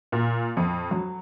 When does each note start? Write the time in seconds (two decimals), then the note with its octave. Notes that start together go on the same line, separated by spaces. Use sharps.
0.12 A#2
0.57 F2
0.91 F#3